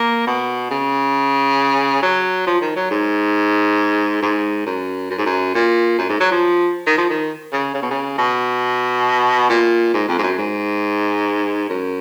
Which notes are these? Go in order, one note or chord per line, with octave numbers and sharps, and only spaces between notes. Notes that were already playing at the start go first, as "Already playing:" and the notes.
Already playing: A#3
B2
C#3
F#3
F3
D#3
F#3
G#2
G#2
F#2
F#2
G#2
F#2
A#2
F#2
G#2
F#3
F3
D#3
F3
D#3
C#3
C#3
B2
C#3
B2
A#2
G#2
F2
G#2
F#2
G#2
F#2